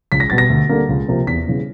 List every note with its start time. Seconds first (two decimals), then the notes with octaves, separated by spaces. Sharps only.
0.12 C#2 B6
0.20 A#6
0.30 B2 G3 B3 A6
0.38 A#6
0.50 D2
0.69 D3 G3 A#3
0.89 C#2
1.08 C3 F3 A#3
1.27 E2 B6
1.46 C#3 E3 G3 B3